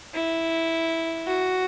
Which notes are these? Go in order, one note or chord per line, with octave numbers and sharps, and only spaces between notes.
E4
F#4